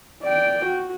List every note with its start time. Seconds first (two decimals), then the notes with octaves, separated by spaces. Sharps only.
0.24 D5 G5
0.66 F#4